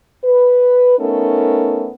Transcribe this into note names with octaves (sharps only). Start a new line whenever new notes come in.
B4
A3 B3 C#4 D#4 A4 A#4